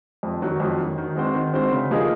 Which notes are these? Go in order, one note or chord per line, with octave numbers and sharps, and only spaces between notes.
F2
D#3 F#3
F2
D#3 F#3
D#3
G#3 C4 F#4 C5
D#3
G#3 C4 F#4 C5
C#3
F3 A#3 D#4 G#4